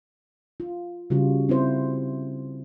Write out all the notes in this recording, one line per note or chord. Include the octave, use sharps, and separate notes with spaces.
F4
C#3 G3 F4 F#4
C4 E4 C5